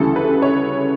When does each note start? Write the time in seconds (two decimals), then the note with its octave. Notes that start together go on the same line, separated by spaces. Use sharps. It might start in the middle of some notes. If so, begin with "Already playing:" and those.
Already playing: D2 C#3 E3 G3 A4
0.16 B4
0.42 C#5